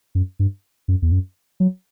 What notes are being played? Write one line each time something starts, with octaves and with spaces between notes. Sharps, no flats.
F#2
G2
F#2
E2
F#2
F#3